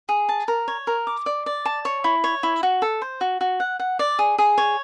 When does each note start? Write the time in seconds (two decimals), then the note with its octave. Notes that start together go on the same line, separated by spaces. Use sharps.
0.09 G#4
0.29 A5
0.48 A#4
0.68 C#5
0.87 A#4
1.07 D6
1.26 D5
1.46 D5
1.65 A5
1.85 C#5
2.04 E4
2.24 C#5
2.43 E4
2.63 F#4
2.82 A4
3.02 C5
3.21 F#4
3.41 F#4
3.60 F#5
3.79 F#5
3.99 D5
4.19 G#4
4.38 G#4
4.58 C#5